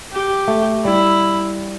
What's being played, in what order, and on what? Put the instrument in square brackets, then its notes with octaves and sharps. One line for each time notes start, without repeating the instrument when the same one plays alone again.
[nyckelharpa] G4
[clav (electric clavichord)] A3
[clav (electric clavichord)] G3 [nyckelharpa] E4